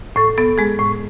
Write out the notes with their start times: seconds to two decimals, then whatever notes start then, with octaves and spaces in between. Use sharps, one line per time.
0.16 A2 A4
0.38 B3 A4
0.58 G#3 G#4
0.79 A2